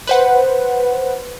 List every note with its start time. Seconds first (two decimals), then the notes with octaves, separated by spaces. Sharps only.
0.07 B4 C5 F#5